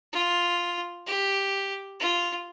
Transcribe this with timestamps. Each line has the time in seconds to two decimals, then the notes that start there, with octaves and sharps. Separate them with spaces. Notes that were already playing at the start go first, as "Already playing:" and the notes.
0.13 F4
1.07 G4
2.00 F4